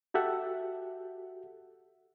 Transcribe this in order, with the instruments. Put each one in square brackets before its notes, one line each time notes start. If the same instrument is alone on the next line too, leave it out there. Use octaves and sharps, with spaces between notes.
[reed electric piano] F#4 G4 A4 E5 F#5